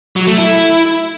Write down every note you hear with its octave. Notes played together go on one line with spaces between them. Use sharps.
F#3
A3
E4